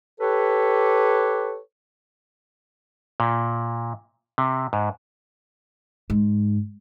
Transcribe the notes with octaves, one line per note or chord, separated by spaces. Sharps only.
G4 A4 B4 C#5
A#2
C3
G#2
G#2